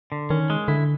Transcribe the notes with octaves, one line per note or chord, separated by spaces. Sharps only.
D3
D#3 C#4
G#3
D3 E4